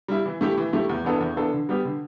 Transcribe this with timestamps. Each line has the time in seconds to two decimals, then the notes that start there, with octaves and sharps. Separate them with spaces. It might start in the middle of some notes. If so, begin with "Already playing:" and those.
0.08 G3 E4
0.26 E3
0.41 A3 E4 G4
0.58 E3
0.73 A3 E4 G4
0.89 E2
1.04 E3 B3 D4 A4
1.20 E2
1.36 E3 B3 D4 A4
1.53 D3
1.69 G3 B3 G4
1.85 D3